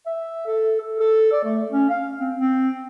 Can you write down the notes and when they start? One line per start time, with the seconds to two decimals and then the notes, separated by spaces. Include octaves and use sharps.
0.06 E5
0.47 A4
0.80 A4
0.99 A4
1.32 D5
1.44 A3
1.71 C#4
1.89 F5
2.19 C4
2.36 C4